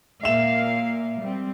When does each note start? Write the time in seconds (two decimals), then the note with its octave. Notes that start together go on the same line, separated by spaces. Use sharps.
0.23 A#2 A#3 E5 F5 E7
1.19 G3 C4